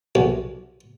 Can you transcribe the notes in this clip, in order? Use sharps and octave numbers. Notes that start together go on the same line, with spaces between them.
B1